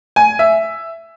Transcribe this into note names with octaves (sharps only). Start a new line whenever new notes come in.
G#5
E5